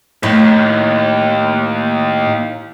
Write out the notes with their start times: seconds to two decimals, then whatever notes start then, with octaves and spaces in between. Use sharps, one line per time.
0.23 D#2 A2